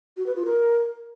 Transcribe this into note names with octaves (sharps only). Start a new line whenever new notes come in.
F#4
B4
F4
A#4